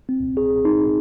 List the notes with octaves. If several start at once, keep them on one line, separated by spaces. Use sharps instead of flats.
C4
G#4
D#4